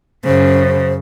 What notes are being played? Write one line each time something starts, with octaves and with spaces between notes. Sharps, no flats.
F#2 C#3 C5